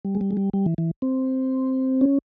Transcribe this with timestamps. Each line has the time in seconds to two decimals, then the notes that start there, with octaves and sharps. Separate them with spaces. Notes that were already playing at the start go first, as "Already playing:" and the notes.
0.05 G3
0.15 G#3
0.21 G3
0.31 G#3
0.37 G3
0.53 G3
0.66 E3
0.78 E3
1.02 C4
2.01 C#4